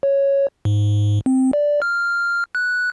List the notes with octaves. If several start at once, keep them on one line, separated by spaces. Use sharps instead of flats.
C#5
G#2
C4
D5
F6
F#6